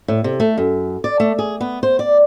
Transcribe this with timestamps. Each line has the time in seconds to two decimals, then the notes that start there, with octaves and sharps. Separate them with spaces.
0.08 A2
0.24 C3
0.40 A3
0.58 F#2
1.04 D5
1.20 A3
1.39 G#4
1.61 B3
1.83 C5
1.99 D5